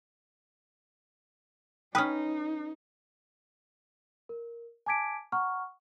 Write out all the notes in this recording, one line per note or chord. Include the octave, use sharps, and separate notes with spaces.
C#4 D#4 B4 G5 D#6 F6
A#4
G#5 A5 D6 G#6 B6 D7
F#5 A#5 C#6 F6